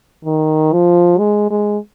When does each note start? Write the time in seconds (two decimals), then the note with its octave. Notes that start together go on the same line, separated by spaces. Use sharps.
0.25 D#3
0.72 F3
1.19 G#3
1.50 G#3